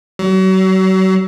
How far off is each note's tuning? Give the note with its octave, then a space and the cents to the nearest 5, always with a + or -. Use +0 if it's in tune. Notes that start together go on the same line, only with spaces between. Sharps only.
F#3 +35